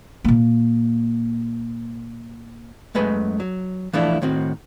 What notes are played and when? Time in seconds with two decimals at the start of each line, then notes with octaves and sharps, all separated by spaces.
0.24 A#2 A#3
2.95 F#2 G#3 A3 B4 G#5
3.40 F#3
3.93 E3 F3 A3 D4 E4
4.22 A2 D#3 C4 F#4